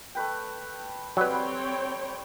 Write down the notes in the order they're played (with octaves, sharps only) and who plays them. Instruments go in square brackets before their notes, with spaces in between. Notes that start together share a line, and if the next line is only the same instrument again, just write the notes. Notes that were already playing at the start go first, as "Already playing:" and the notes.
[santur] A3 B4 G5
[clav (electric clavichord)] F#3 B4 [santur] G3 [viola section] C4 C#5 G5